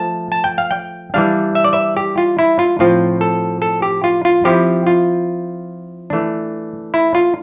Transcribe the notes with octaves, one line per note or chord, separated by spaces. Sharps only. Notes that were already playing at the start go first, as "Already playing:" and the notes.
Already playing: F3 A3 A5
A5
G5
F5
G5
E3 G3 D4 F5
E5
D5
E5
G4
F4
E4
F4
A2 F3 C4 F4
A4
A4
G4
F4
F4
F3 C4 E4 G4
F4
E3 A3 D4
E4
F4